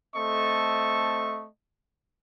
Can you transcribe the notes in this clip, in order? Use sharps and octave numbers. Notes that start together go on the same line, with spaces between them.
A3 C4 A4 D#5 C#6